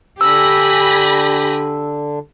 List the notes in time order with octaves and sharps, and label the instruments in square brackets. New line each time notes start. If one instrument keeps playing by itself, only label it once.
[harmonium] D3 D4 [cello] G4 [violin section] G#5 B5 A#6 [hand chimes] E6